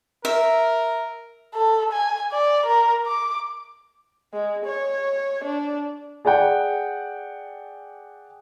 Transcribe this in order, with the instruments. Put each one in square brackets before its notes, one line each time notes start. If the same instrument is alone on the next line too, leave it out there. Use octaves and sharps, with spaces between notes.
[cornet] A#4 [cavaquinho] E5
[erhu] A4
G#5
D5
A#4
D6
[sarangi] G#3
C#5
D4
[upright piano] G#4 D5 F#5 G5